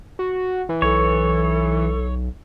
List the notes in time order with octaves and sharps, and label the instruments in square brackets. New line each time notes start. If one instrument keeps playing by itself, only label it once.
[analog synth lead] F#4
E3
[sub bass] B1 [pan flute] A4 [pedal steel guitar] C#5